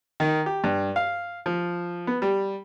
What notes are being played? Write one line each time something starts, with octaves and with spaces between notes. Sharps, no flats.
D#3
G4
G2
F5
F3
B3
G3